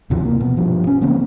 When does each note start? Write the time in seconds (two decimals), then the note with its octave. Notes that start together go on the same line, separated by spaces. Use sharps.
0.10 D#2 C3 E3 F3
0.25 A#3
0.41 B2
0.57 G2 F3
0.87 C#4
1.02 C#3 E3 A#3 C4